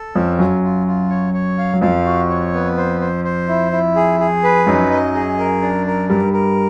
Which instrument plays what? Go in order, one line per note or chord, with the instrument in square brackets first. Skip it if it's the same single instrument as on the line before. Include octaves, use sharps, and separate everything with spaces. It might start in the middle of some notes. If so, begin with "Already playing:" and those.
Already playing: [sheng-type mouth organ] A4
[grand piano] F2 F3 [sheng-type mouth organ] C#4
[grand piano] F#2 F#3 [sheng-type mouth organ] F4
[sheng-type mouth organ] F4
F4
C#5
C#5
F5
[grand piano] F#3
[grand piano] F2 F3 [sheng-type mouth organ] F5
[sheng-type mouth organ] F#4
C#5
B3
C5
C5
C5
E4
E4
G#4
G#4
B4
[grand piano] F#2 F#3 [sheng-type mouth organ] D#4
[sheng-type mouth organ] D#5
G#4
A#4
D4
A#4
[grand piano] G2 G3 [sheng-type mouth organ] A#4
[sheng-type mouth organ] A#4